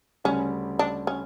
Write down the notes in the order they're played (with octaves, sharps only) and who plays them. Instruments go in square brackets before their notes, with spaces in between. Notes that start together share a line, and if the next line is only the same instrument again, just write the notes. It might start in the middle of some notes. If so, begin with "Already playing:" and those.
[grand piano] D2 C#3 G3 [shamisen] C#4
[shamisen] D4
C#4